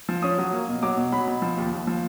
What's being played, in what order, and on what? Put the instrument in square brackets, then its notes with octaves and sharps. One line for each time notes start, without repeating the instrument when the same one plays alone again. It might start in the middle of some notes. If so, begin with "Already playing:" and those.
[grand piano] F3
C#4 D#6
F#3
A#3
B2
F#3 D6
B2
F#3 B5
B2
F3
D#2
D#2
F3